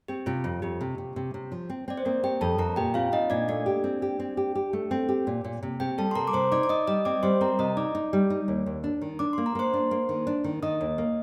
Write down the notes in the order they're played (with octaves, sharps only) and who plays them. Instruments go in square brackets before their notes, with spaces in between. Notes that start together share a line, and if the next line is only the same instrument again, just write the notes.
[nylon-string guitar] C4 [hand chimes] G4
[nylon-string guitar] C3 [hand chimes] F4
[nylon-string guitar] F2 [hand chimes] F4
[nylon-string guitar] F2 [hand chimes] G4
[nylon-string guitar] C3
C3
C3
C3
F3
C4
[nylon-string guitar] C4 [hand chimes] D5
[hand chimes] C5
[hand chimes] A#3 A#4 [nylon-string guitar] C4
[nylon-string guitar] C4 [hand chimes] G4 G5
[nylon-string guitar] F2 [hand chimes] A4 A5
[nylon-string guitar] F2 [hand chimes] A#4 A#5
[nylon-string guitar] A#2 [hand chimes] G4 G5
[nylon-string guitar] C4 [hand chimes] F4 F5
[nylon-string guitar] C4 [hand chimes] D#4 D#5
[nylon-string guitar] A#2 [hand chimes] D4 D5
[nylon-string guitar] A3 [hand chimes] D4 D5
[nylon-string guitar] G4
C4
G4
C4
G4
G4
A3
C4
G4
A#2
A#2
C3
[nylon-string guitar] C4 [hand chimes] G4 G5
[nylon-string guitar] G3 [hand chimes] A4 A5
[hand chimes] C6
[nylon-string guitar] C3 [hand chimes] A#4 A#5
[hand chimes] D6
[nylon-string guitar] C3 [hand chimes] C5 C6
[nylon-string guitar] D#4 [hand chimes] D5 D6
[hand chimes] D6
[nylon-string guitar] D#4 [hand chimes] D#5 D#6
[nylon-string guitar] G3 [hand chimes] D#5 D#6
[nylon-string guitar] C4 [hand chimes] D5 D6
[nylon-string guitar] G3 [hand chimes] C5 C6
[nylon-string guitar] C4 [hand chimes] A#4 A#5
[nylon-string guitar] C3 [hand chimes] D#5 D#6
[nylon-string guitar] D#4 [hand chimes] D5 D6
[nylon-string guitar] D#4
G3
D#4
D#2
D#2
D4
D#3
[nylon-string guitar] D4 [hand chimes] D6
[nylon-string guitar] A#3 [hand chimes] C6
[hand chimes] A#5
[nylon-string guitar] A#3 [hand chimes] C5 C6
[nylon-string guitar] D4
A#3
D#3
D4
D#3
[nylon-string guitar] D#3 [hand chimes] D#5 D#6
[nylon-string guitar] D#2
A#3